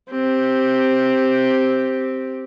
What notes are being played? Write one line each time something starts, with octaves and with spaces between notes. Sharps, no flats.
C4 G4